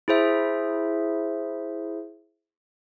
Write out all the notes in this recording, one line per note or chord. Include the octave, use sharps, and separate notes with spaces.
E4 G#4 C5 E5